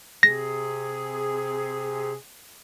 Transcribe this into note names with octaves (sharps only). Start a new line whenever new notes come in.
C3 G#4 A#6